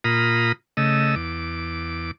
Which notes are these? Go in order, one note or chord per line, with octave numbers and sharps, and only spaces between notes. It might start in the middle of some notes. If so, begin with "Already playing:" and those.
A#2 F4 A#5 B5 D#6
C#3 A3 D#5 E6
E2 D6